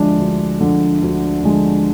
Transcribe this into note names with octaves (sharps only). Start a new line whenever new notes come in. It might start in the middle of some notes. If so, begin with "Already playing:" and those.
Already playing: D2 D3 F3 G#3 D4 E4
D2
D3 F3 G#3
D2
D3 F3 G#3